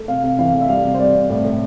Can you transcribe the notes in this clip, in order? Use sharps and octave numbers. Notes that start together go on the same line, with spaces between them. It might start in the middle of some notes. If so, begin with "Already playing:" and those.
Already playing: A3
C3 F5
C3
E3 F5
A3
E5
G3 F5
C3
C5
G3 D5
C3
A2 D5
A2